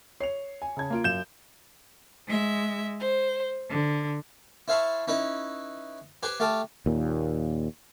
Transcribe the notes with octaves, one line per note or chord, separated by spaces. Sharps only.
C#5 C7 F7
G#5
C#3 A5 G#6
A#3 F4 D7
F#2 F5 G6 E7
G#3 E5
C5
D3
E4 C5 F5 A5 B5 C#6
C#4 D#4 E4 B4
G4 B4 C5 G#5
A3 G4 F5 G5 A5
D#2 A#2